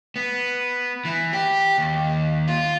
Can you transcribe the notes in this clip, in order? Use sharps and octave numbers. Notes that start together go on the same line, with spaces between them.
B3
E3
G4
D#2
F4